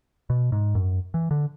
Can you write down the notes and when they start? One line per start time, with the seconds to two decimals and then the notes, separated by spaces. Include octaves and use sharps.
0.30 B2
0.52 G#2
0.75 F#2
1.14 E3
1.31 D3